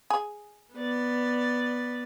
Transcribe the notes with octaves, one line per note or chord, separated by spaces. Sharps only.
G#4
B3 D5